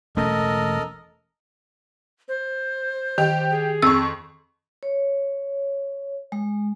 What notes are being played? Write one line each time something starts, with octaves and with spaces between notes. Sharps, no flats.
E1 A3 C#4 A4 A#4 D#5
C5
D#3 G4
G#4
F2 C#6 E6
C#5
G#3